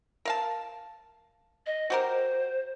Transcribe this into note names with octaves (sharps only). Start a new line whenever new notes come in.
A#4 F5 A5
D#5
F#4 G4 A#4 C5